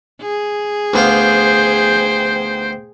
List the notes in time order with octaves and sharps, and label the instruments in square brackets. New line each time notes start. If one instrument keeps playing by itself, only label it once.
[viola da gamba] G#4
[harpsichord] D2 B3 F5 [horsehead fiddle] C5 G5